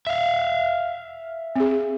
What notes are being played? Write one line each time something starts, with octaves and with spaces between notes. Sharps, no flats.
E5 F5
C4 G#4